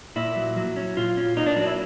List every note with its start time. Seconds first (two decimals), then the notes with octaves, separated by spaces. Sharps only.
0.16 A#2 E4
0.36 F#3
0.56 F#3
0.76 C#4
0.97 A#2 F4
1.17 C#4
1.37 A#3 D#4
1.46 D4
1.56 F#3 D4
1.67 E4